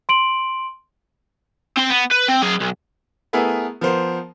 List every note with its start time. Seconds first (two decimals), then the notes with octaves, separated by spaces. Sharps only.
0.09 C6 D7 F#7
1.77 C4 C6
1.90 B3
2.11 B4
2.28 C4
2.42 F#3 G#4
2.60 B1
3.33 A3 B3 E4 G#4 A#4
3.81 F3 B3 A#4 C5